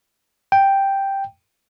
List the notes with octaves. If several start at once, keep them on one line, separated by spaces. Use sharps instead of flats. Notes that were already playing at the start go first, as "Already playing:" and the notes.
G5